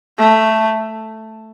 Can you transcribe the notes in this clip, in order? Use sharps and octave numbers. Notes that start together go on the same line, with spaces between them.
A3